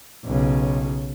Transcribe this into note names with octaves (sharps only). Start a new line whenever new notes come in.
B1 C#3